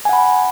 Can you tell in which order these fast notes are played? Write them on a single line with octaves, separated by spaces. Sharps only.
G#5 F#5 B5